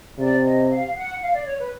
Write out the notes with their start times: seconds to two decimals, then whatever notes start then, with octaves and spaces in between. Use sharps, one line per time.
0.18 C3 D5
0.45 D#5
0.70 F5
0.96 F#5
1.21 F5
1.34 D5
1.46 C#5
1.59 B4